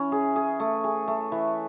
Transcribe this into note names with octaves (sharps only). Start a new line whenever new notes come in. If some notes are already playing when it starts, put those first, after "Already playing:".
Already playing: E3 C#4
G#4
G#4
A3
G#4
A3
E3